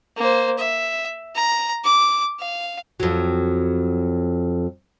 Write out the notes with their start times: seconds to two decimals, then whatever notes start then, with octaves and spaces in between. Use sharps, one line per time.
0.17 A#3 C5
0.58 E5
1.35 A#5
1.84 D6
2.39 F5
3.00 F2 F#3